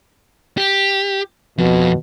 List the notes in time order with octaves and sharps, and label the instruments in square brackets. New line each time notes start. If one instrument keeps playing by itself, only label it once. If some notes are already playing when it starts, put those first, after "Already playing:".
[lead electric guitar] G4
[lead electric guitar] F2 [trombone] B2